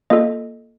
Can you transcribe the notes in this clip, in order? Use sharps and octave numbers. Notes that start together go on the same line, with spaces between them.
A#3 F4 A4 D#5